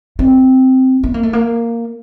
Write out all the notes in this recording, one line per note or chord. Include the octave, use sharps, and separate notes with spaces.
C4
B3
A#3
A3
A#3